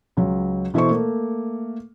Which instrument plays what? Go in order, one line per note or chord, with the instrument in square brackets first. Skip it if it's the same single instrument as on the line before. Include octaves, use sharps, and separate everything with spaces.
[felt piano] C#2 F#3
B2 E3 E4 A4 C5 C#6
A3 A#3